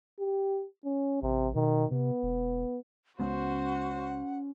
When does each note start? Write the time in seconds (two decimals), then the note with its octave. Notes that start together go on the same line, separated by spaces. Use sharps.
0.19 G4
0.85 C#4
1.22 A1 C3
1.55 B2 D#3
1.91 C3 B3
2.23 E1
3.20 C#2 G#3 B3 C#4 F#4 C5 F#5